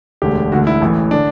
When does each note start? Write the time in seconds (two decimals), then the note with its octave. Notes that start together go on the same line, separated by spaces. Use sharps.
0.22 E1 D2 D3 G4
0.51 E1 D2 D3 F#4
0.67 E4
0.81 A1 A2 E3
1.11 D3 D4